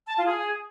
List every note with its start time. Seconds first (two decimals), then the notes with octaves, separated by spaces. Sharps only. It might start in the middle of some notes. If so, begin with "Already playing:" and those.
0.08 A5
0.17 F4
0.25 G#4